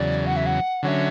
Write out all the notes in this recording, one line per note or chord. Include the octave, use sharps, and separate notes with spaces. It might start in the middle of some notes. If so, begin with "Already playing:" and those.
Already playing: E2 C#3 F#3 D5
F#5
E5
F#5
D3 F#3 C#4 E5 F#5